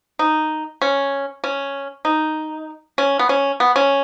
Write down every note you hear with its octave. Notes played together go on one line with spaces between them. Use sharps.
D#4
C#4
C#4
D#4
C#4
B3
C#4
B3
C#4